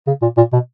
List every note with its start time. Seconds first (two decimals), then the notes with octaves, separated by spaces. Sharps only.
0.07 C#3
0.22 A#2
0.37 A#2
0.52 B2